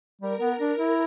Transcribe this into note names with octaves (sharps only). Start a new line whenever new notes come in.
G3 A#4
B3
D4
E4